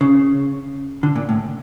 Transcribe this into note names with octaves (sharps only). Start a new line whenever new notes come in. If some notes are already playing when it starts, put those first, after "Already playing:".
C#3
D3
A#2
A2